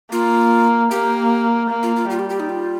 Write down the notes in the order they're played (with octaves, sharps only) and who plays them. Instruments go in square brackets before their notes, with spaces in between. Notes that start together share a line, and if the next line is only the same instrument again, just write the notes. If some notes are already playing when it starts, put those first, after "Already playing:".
[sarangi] A#3 [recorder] F4
[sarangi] A#3 [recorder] G4
[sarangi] A#3
[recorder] F4
F4
[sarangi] G3 [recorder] F4
[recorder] G4
G4
D#4
F4